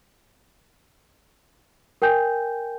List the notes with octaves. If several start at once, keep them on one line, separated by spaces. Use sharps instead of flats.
A#4 G5 G#5 G6